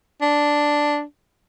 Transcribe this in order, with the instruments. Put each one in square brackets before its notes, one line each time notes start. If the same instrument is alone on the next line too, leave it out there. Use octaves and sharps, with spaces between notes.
[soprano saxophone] D4